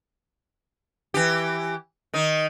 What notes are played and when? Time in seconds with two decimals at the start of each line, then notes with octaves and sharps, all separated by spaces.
1.14 E3 G4
2.14 D#3 D#4